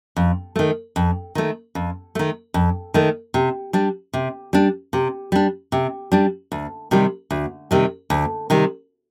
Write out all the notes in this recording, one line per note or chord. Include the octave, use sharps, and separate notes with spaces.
F2
D#3 A3
F2
D#3 A3
F2
D#3 A3
F2
D#3 A3
C3
G3 D4
C3
G3 D4
C3
G3 D4
C3
G3 D4
D2
C3 D#3 G3
D2
C3 D#3 G3
D2
C3 D#3 G3